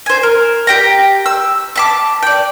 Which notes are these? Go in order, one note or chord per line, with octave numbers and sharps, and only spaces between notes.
C5 G#5
A#4
G4 G5 A#5
E6
A5 B5 D6
D5 G5